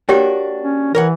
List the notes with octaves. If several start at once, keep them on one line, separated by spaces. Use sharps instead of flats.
A#3 D4 F#4 G4 C#5 G5
C#4
E3 A#4 C#5 F#5